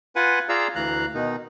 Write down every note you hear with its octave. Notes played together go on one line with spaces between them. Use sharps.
F4 B4 F#5 G#5
F4 G#4 D5 F5 A#5 E6
D2 E3 F5 A#5 F#6
B2 D#3 D#4